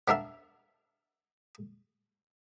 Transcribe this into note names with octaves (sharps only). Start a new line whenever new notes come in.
B3 D4 A#4 E5